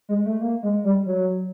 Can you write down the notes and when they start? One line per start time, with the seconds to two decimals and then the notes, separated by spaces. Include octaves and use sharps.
0.09 G#3
0.26 A3
0.41 A#3
0.63 G#3
0.84 G3
1.06 F#3